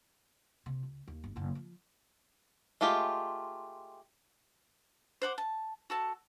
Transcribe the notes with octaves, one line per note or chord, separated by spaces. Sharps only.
C3
C#2
D#2
G1
F#1 B2
F3
G#3 A3 F4 G4
C5 F#5 D6
A5
F#4 A4 A5